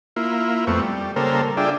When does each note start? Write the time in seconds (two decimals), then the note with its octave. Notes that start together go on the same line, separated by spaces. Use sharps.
0.16 A#3 E4 F4
0.67 F2 A3 B3 C4 C#6
0.81 G3
1.16 C#3 G3 A#3 A4 A#4 C5
1.57 D4 F4 G#4 D5 E5 G5